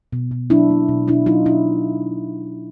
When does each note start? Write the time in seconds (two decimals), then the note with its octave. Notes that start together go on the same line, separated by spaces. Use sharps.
0.13 B2
0.31 B2
0.50 F#3 D4 E4
0.70 A#3
0.89 B2
1.07 B2 D4 E4
1.26 F#3 D#4 F4
1.46 B2 D4 E4